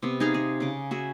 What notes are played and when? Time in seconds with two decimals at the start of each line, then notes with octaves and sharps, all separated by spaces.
0.03 C3 B3
0.20 D#4 G#4 F5 A#5
0.34 G#4
0.60 C#3 D6
0.91 F#4 G#4 E5